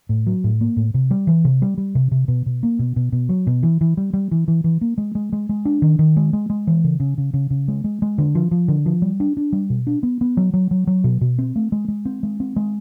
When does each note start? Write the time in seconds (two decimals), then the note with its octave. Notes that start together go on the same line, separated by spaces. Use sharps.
0.09 A2
0.27 F#3
0.44 A2
0.61 A#3
0.77 A2
0.94 C3
1.11 G3
1.27 E3
1.45 C3
1.62 G3
1.78 G3
1.95 C3
2.11 C3
2.28 B2
2.46 B2
2.63 A#3
2.79 B2
2.96 B2
3.12 B2
3.29 F#3
3.47 B2
3.63 E3
3.81 E3
3.97 G3
4.13 G3
4.31 E3
4.48 E3
4.64 E3
4.81 A#3
4.98 G#3
5.15 G#3
5.33 G#3
5.49 G#3
5.65 D4
5.82 D#3
5.99 D#3
6.17 G#3
6.33 G#3
6.50 G#3
6.67 E3
6.84 C#3
7.00 C#3
7.18 C#3
7.34 C#3
7.50 C#3
7.68 G#3
7.84 G#3
8.02 G#3
8.18 D3
8.35 F3
8.51 F3
8.68 D3
8.86 F3
9.02 G3
9.20 D4
9.37 D4
9.53 G3
9.70 B2
9.87 D4
10.03 B3
10.21 B3
10.37 F#3
10.54 F#3
10.71 F#3
10.87 F#3
11.04 B2
11.21 B2
11.38 C4
11.56 A3
11.72 G#3
11.88 G#3
12.05 C4
12.23 G#3
12.40 C4
12.56 G#3